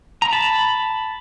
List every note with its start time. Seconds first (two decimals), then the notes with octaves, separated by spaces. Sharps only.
0.22 A#5
0.32 A5 B5